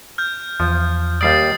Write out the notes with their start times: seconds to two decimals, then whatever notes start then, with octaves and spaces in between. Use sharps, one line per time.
0.18 F6 G6
0.60 E2 F3
1.21 D#2 G3 D5 D#6 A6 C7